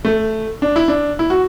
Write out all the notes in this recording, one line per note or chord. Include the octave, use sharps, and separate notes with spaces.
A3
D4
E4
D4
E4
F#4